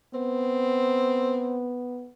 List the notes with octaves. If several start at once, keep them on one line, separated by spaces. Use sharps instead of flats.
B3 C4